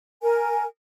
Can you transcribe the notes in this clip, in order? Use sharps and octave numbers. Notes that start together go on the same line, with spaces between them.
A#4 G#5